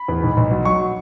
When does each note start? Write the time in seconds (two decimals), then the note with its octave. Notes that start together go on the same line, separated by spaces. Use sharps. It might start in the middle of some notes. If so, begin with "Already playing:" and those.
Already playing: B5
0.08 E2
0.23 B1
0.37 B1
0.51 F#3
0.65 F#3 C#6